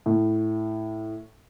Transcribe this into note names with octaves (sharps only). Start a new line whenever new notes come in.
A2